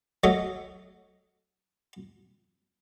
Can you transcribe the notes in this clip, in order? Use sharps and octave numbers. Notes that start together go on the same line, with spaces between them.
F#3 A3 A4 D#5